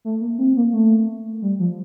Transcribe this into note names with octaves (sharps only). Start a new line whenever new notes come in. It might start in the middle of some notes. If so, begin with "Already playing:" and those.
A3
A#3
C4
A#3
A3
G3
F3